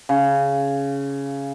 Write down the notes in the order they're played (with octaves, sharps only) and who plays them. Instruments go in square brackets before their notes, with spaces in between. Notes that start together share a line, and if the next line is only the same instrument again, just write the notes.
[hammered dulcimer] C#3